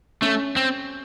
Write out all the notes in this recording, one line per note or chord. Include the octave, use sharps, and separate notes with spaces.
A3 C#4
C4